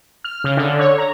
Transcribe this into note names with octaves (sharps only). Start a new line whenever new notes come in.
F6
C#3
D3
C#5
A#5